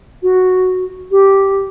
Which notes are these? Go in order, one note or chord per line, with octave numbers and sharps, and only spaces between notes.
F#4
G4